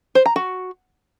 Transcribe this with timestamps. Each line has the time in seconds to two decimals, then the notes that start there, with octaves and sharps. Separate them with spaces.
0.15 C5
0.26 A#5
0.36 F#4